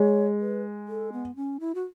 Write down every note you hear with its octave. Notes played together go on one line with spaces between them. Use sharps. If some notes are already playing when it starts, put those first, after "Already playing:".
Already playing: G#3 C#5
B4
A4
B3
C#4
E4
F#4